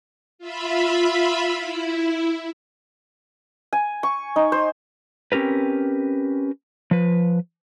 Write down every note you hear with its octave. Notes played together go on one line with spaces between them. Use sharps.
F4 E5 B5
E4
G#5
C#6
D#4
C5
C4 C#4 G4 A#4 B4
F3 B4